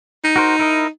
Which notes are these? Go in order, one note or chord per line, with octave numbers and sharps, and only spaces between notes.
D#4
F#4 A#4 C5
E4 A#4 D#5